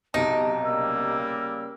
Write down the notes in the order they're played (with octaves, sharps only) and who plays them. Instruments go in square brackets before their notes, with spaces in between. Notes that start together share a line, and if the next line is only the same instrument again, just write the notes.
[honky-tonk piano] B1 C3 D7 [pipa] D#4 [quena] A5
[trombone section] C#3 G3 A#3 [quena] E6